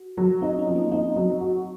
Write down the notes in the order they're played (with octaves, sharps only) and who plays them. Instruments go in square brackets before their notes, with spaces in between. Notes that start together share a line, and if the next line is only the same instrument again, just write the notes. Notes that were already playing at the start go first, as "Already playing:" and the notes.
Already playing: [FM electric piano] F#4
[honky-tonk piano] F#3
[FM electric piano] C4 [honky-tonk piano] D#4
[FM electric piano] C#4
[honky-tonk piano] F3
[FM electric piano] A#3
[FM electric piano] C4 [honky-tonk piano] D#4
[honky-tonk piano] F#3
F#4